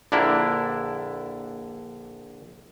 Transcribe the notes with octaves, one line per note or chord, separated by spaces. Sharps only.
A#1 D3 D4 E4 A#4